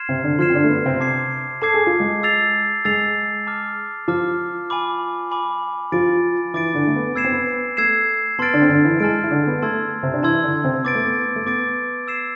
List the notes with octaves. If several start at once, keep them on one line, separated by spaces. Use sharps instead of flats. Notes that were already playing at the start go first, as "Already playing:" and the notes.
Already playing: C6 F6 G#6 C7 E7
C3 C4
D3 D4
F3 F4 C6 F6 G#6 C7 E7
C4
D3 D4
A3
B3
C3 C4
A5 D6 G#6 C7
A4 A5 D6 G#6 C7
G#4
F4
G#3 G#4
E6 A6 C7 F7
G#3 G#4 E6 A6 C7 F7
A5 D6 F6
F3 F4 A5 D6 F6
G#5 B5 D6
G#5 B5 D6
F3 F4 D6 A6 D7
E3 E4 D6 A6 D7
D3 D4
A3
B3
B3 E6 G#6 C7 E7
C4
B3
A3 E6 G#6 C7 E7
B3 A5 C6 F6 A6 D7
D3 D4
C4
D3 D4
E3 E4
G#3 G#4 A5 C6 F6 A6 D7
E4
D3 D4
B3
A3 A5 C6 E6 G#6
C3 C4
D4
E3 E4 A5 C6 E6 G#6
D3 D4
C3 C4
B3 D6 A6 D7
A3
B3
A3
B3 D6 A6 D7
E6 G#6 C7 E7